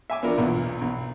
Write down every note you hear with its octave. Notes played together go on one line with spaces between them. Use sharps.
E5 G#5 D6
B3 D4 F4 A#4
B1 E2 A#2
B1